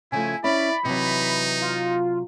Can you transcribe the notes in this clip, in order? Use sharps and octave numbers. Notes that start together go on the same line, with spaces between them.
C#3 F3 A3 E4 G#5
C#4 E4 D5 E5 B5
C3 E3 F#3 D#4
F4